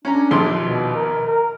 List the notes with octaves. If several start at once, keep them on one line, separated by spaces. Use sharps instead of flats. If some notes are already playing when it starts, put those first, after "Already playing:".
C#4 D4 A#5
A#1 D#2 C6
B2
A#4
A#4